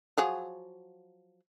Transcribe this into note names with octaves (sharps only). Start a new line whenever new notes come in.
F3 F#3 G#4